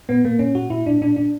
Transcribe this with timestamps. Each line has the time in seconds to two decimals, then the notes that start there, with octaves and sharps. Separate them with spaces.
0.09 A#2 B3
0.24 A#2 A#3
0.39 A#2 C#4
0.55 A#2 F#4
0.70 A#2 E4
0.86 A#2 D4
1.01 A#2 D4
1.16 A#2 D4